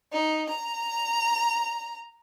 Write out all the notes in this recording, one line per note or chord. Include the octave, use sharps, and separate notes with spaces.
D#4
A#5